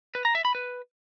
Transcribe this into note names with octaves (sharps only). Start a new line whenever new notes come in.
B4
A#5
E5
B5
B4